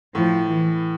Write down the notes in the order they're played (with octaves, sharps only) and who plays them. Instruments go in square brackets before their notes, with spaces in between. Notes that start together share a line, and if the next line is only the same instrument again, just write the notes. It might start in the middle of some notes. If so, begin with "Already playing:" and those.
[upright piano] A2 [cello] F3
[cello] E3